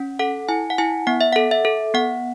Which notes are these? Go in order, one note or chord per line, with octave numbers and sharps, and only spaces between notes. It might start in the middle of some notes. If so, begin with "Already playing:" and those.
Already playing: C#4
A4 F#5
E4 G#5
F#5
E4 G#5
B3 F#5
E5
A4 F#5
E5
A4
B3 F#5